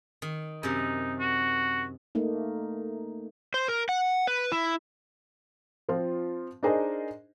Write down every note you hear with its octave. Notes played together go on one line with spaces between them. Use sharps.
D#3
F#2 C3 D#4
F#4
A3 A#3 D#4
C5
A#4
F#5
B4
E4
F3 C4 F4
D4 D#4 G#4 A#4 C5 D#5